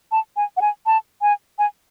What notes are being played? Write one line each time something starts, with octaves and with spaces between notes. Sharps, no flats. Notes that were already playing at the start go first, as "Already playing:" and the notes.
A5
G#5
F#5
G#5
A5
G#5
G#5